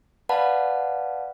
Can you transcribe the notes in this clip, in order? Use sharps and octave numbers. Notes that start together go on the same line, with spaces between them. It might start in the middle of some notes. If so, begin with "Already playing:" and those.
B4 D5 F5 F#5 A5 B5